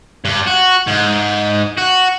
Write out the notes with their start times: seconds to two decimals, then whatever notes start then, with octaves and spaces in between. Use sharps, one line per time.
0.25 G2
0.46 F#4
0.87 G#2
1.77 F#4